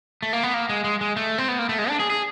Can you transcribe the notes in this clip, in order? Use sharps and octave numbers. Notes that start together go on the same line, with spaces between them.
A3
A#3
B3
A#3
G#3
G#3
G#3
A3
C4
B3
A#3
A3
G#3
D4
G#4
G#4